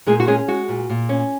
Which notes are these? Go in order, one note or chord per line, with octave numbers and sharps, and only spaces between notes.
A#2 G#3 G#4
F#4
G#3 C#4 G#4
G#3 F#4
A#2
A#2
C#4